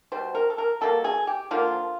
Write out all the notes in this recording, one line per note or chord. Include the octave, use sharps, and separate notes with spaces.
B2 G3 C5
A#4
A4
A#4
B2 G3 A#3 A4
G#4
G4
D3 F3 A#3 F4